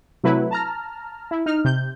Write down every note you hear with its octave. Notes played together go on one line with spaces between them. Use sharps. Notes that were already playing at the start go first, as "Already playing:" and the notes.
C3 F#3 A3 E4 B4
A5 A#5 F6
E4
D#4 F6
C3 G6